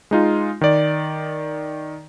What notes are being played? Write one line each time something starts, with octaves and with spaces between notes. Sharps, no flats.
G#3 D#4 F4
D#3 D5